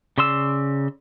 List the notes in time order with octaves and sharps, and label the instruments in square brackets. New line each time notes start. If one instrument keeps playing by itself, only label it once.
[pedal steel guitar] C#3 D5 C6 E6